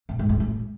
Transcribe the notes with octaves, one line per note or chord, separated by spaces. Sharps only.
B2
G#2
G#2
A2